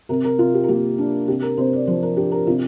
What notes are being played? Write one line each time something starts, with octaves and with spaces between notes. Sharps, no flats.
C3 A#4
A#4
C3 F4
G4
A#4
A#3 G4
D4
C3 G4
A#4
C3 C5
D5
F3 C5
A#4
D4 G4
A#4
C3 F4